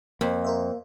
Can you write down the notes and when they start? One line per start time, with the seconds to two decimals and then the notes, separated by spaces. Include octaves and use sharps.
0.21 F2 A#3
0.44 A#4 C5 E5